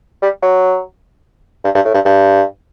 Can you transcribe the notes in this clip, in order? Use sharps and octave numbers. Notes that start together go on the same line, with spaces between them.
G3
F#3
G2
G2
A2
G2
G2